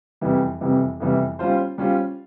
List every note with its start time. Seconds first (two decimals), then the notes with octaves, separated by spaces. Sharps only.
0.21 F2 C3 E3 G3
0.61 F2 C3 E3 G3
1.00 F2 C3 E3 G3
1.39 G3 C#4 F4 C5
1.78 G3 C#4 F4 C5